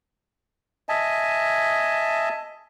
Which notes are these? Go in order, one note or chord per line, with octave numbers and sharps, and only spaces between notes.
D#5 E5 G#5 A5